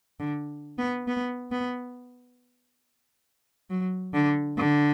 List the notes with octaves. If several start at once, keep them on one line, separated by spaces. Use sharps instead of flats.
D3
B3
B3
B3
F#3
D3
D3